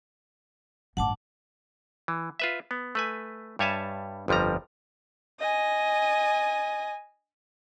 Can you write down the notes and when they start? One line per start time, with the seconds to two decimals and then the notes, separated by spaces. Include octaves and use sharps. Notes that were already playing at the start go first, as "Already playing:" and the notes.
0.97 A1 G2 F#5 A5 D6
2.08 E3
2.40 F4 B4 E5
2.71 B3
2.95 A3 B4 G#5
3.59 G2 G3 C#5 E5 G#5 A5
4.28 G1 F2 F3 G3 A#5
5.40 D#5 G#5